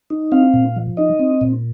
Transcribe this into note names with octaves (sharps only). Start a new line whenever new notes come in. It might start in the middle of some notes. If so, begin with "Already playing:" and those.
D#4
C4 F5
A#2
F3
D#4 D#5
C4
A#2